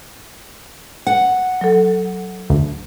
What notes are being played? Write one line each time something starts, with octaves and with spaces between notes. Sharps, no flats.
F#5
F#3 A4
D2